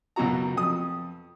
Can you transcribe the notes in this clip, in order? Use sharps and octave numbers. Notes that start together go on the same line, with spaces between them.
C#2 F#2 B2 F#4 A#5
F2 D#6